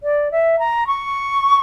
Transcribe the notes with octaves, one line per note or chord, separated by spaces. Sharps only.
D5
E5
A#5
C#6